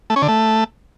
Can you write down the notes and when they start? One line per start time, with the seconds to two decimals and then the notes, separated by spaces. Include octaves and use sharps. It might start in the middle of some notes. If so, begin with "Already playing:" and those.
0.10 A3
0.16 C#4
0.22 D3
0.28 A3